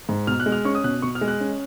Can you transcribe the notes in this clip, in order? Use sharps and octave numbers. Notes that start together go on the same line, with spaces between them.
G#2
B2 F6
F#6
G#3
F6
C#4 C#6
D#6
B2 F#6
B2 C#6
F6
G#3
F#6
C#4